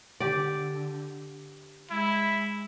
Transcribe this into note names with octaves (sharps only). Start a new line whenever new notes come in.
D3 G4 D5
G#3 E4